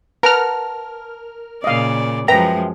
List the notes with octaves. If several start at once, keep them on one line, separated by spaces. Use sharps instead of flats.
A#4 B4 F#5 A5 A#5 F6
A#2 C#3 D5 D#5 F5
F#2 F3 G#3 B4 E5 G5 A#5